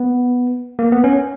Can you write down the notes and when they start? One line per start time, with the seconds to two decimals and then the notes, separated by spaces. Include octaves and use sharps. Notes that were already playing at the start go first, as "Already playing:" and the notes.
Already playing: B3
0.79 A#3
0.92 B3
1.04 C#4